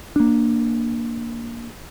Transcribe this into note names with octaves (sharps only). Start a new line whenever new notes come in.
A#3 D4